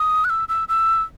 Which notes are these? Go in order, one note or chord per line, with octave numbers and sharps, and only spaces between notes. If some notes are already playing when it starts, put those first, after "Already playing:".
Already playing: D#6
F#6
E6
E6
E6